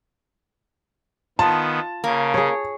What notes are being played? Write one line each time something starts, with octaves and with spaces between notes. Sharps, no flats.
D#3 B3 F4 A5
C#3 A#3
G#4 C#5